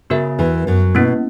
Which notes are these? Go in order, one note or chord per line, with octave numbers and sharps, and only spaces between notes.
C#3 B3 F#4 A#4 E5
E2 E3
F#2 F#3
B2 A#3 C#4 E4